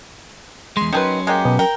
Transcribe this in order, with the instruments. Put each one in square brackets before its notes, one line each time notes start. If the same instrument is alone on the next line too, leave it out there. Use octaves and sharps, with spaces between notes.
[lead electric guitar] E2 G#3 [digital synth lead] C6
[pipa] D#3 G#4 B4 [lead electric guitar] F#3 C#4
[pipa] G#3 A#3 G4
[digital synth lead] B2
[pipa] A#4 [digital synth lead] G5